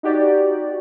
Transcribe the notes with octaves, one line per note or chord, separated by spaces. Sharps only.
D#4 F#4 G4 D5